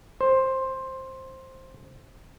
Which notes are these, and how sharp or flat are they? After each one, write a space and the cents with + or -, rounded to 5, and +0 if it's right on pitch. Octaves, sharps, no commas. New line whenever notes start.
C5 +10